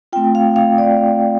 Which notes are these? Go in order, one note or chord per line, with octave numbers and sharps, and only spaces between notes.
A3 C4 F4 G5
F5
F5
D5